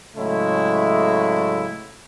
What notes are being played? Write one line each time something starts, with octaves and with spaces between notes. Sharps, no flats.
A2 C#3 F#3 G#3 A3 E4